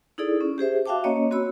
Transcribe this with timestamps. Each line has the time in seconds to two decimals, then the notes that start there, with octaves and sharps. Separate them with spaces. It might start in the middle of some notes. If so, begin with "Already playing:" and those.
0.18 D#4 E4 G#4 A4 D5
0.41 C#4
0.58 G4 G#4 C5 E5
0.86 F#4 E5 F5 G5 A5 D6
1.04 A#3 C#4 C#5 D#5
1.31 C4 F#4 C#5 B5 E6